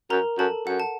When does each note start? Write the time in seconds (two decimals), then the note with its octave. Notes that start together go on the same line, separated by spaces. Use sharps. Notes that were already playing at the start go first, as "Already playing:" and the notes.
0.10 F#2 A#4 A#5
0.38 F#2 A4 A5
0.67 F#2 F#5
0.80 A5